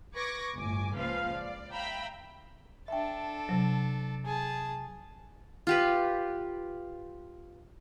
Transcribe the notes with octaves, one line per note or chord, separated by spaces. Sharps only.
B4 C#6 D6 G#6 A#6
G1 A2 G#5 D6
C#2 A#2 F3 B4 F5
D5
E5 F5 G5 A#5 B5
D4 A4 E5 G5
C3 F#3
G#4 A5
F4 G4 B4